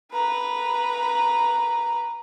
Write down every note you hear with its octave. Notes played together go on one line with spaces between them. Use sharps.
B4 A#5